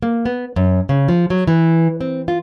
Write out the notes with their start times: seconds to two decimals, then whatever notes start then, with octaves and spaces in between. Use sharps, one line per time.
0.02 A#3
0.25 B3
0.56 F#2
0.89 C#3
1.08 F3
1.30 F#3
1.47 E3
2.01 C4
2.28 F4